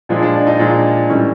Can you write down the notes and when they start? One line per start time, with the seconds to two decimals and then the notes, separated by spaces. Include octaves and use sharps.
0.09 A#2 F3 G#3 D4
0.23 D4
0.35 D4
0.47 D#4
0.59 A#2 F3 G#3 D4
1.10 A2 E3 G3 C#4